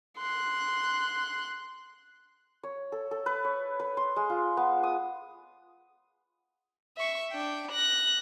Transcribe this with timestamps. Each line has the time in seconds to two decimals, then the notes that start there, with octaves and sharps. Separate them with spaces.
0.18 C6 F#6
2.63 C#5
2.92 A4
3.11 A4
3.26 B4
3.45 C#5
3.80 B4
3.97 C6
4.16 G#3
4.30 F4
4.57 B3
4.83 D#6
6.97 E5 C#6
7.31 D4 G5
7.72 F#6 A#6